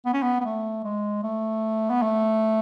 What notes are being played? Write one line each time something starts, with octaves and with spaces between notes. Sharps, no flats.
B3
C#4
B3
B3
A3
G#3
A3
B3
A3